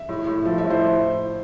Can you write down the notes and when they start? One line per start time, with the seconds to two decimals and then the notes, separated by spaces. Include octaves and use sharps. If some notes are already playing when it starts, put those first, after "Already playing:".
Already playing: E5
0.09 A2
0.27 A2
0.45 F3
0.58 E5
0.64 A2
0.70 C5